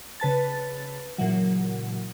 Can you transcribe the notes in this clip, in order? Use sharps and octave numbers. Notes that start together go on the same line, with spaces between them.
C#3 B4 A5 A6
A#2 C#3 E3 F#3